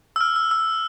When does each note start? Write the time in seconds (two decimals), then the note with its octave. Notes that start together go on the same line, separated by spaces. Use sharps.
0.16 E6
0.21 F6
0.36 E6
0.51 E6